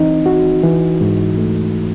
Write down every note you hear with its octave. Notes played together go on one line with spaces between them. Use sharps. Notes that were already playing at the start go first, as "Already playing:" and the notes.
Already playing: E3 C4 D#4
F#4
E3
G#2
A3